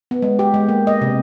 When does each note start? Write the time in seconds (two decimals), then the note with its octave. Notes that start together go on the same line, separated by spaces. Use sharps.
0.11 B3
0.22 G#3
0.39 G4
0.54 G#3
0.69 A#3
0.87 D#5
1.01 C3